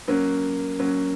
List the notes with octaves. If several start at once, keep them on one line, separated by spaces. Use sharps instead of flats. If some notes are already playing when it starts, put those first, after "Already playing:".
F#3 A#3 C#4
F#3 A#3 C#4